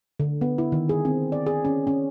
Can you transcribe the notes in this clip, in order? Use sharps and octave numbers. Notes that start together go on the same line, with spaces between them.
D3
B3
E4
D#3
G#4
C4
D5
G#4
C#4
C#4